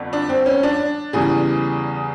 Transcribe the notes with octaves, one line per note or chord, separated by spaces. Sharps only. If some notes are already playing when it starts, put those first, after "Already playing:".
Already playing: G1 F2 D3
D4
C4
C#4
D4
E2 C#3 E3 G3 G#4